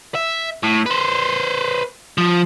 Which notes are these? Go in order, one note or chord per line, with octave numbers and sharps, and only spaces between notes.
E5
A2
B4 C5
F3